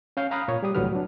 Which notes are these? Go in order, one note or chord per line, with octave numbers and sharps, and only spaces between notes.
C#4 F5 G6
F5 A#5 B5 D#6 F6 F#6
A#2 C#5
G3 G4 D#6
C2 A2 D3 F#3 B4 F6
F#3 D4